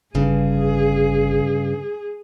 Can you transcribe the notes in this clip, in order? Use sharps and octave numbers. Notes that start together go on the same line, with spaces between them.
G1 G2 C#3 G#4